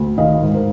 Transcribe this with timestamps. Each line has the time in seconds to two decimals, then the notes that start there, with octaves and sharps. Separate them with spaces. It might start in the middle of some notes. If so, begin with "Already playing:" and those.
Already playing: D2
0.18 D#3 D#5 F5
0.42 G#2
0.54 A#4 C5